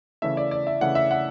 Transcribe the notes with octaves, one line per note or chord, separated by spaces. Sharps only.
C#3 E3 A3 E5
D5
D5
E5
C#3 E3 A3 F#5
E5
F#5